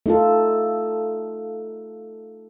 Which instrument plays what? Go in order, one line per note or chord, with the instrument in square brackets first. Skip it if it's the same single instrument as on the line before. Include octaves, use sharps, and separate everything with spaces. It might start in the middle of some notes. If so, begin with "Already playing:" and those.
[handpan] A3 D#4 F4 A4